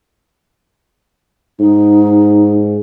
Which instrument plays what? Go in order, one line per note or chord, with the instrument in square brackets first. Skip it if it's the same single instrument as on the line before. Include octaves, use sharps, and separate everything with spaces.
[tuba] G#2 [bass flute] D#4